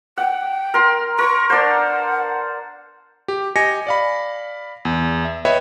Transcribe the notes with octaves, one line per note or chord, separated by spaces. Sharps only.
F#5 G5
A#4 C6
A#4 C#6
D4 C5 F#5
G4
G4 D#5 G#5 A#6 C#7
D5 F5 B5
E2
E5
B4 C#5 D#5 E5 G5 B5